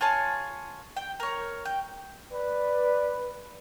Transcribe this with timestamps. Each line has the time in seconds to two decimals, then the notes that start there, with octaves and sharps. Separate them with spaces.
0.01 F4 G#4 C#5 A5
0.97 G5
1.20 A#4 C#5
1.65 G5
2.32 B4 D5